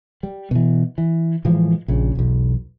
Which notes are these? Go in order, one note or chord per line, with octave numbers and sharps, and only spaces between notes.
G3
B2 E3
E3
A2 E3 F3 G#3
A#1 C#3
E1 B1